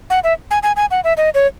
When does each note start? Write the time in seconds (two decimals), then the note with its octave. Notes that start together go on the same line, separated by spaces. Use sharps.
0.10 F#5
0.24 E5
0.51 G#5
0.63 G#5
0.76 G#5
0.91 F#5
1.04 E5
1.17 D#5
1.34 C#5